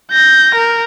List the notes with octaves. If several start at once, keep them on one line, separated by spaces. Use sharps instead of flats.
G6 A#6
A#4